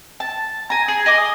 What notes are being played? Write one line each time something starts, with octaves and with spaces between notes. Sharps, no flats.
A5
G#5 A#5
G#4
D#5 G#5 D6
D#6